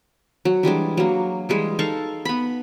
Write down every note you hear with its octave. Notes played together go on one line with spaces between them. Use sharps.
F#3
E3 G3 G#3 D4
F#3 A#3
E3 G3 G#3
D#4 A4 F5 C#6
B3 B5